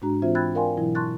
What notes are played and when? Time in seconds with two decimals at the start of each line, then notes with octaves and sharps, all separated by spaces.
0.02 G#2 G#3 D4 F#4 A#5
0.22 E3 C4 F4 C5 E5
0.35 G5 B5 E6 F#6 G#6 A6
0.55 A#4 D5 F5 G5 G#5 C6
0.77 B2 E3 F#3 E4
0.95 A5 C6 C#6 F#6 A6